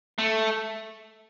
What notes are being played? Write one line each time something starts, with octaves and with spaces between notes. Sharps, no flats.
A3